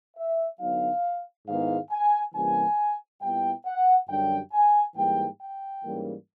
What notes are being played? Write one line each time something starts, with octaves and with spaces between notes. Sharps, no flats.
E5
D3 F#3 B3 D#4 F5
G#2 D#3 G#3 B3 E4 F5
G#5
C3 E3 G3 A#3 C#4 G#5
A#2 G3 B3 E4 G5
F#5
F#2 D3 G3 G5
G#5
G#2 E3 G3 A#3 G5
G5
G#2 E3 G3 A#3 C#4